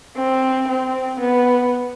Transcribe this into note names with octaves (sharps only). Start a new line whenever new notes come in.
C4
C4
B3